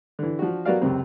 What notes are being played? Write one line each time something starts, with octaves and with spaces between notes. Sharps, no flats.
D3 E3
F3 D4 F#4
F#3 B3 F#4 A#4 D5 F5
C#2 F#2 C3 C4